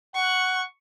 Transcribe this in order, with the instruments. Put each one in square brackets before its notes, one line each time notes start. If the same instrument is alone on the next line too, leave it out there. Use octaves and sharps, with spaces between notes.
[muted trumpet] F#5 [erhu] C#6